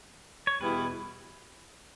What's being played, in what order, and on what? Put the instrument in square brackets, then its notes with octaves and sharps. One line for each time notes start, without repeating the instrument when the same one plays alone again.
[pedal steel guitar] C#5
[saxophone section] E2 B2 G3 B3 E4 [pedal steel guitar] B4